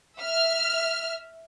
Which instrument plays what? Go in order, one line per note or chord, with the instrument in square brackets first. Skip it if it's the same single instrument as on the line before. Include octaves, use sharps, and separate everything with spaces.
[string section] E5 F6